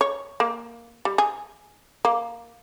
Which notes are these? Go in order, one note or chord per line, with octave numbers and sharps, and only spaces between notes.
C#5
A#3
G3
G#4
A#3